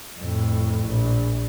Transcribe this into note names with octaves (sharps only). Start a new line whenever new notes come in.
F2 A2
A#1